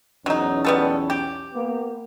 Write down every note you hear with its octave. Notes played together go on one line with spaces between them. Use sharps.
B1 E2 F#3 C#4 D#4
G3 B3 A4
G4
A#3 B3